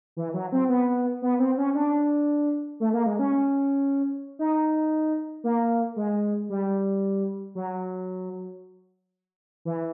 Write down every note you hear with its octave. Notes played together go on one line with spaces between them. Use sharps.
E3
F#3
C4
B3
B3
C4
C#4
D4
A3
A#3
G#3
C#4
D#4
A#3
G#3
G3
F#3
E3